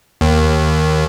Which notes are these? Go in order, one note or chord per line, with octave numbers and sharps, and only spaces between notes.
D#2